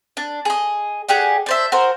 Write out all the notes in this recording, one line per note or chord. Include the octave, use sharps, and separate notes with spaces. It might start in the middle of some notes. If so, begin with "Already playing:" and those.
D4
G#4 D#5
D4 G4 G#4 F#5
D4 C5 E5
F#4 A#4 C5